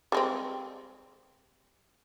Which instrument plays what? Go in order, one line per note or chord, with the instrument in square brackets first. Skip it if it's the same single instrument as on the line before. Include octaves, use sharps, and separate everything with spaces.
[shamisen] G3 G#3 C4